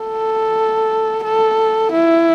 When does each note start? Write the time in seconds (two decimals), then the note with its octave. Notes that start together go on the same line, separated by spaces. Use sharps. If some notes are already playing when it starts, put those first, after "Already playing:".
Already playing: A4
1.24 A4
1.92 E4